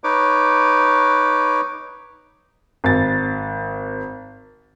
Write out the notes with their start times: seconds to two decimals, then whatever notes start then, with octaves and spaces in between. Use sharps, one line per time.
0.04 D#4 B4 C#5 D6
2.84 G#1 A6